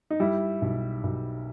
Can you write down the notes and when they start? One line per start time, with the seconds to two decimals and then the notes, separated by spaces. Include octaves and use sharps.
0.10 D#4
0.20 G3 E4
0.62 B1
1.03 B1